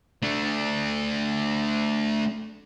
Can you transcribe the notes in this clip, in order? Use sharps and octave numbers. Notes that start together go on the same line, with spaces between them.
A3 D4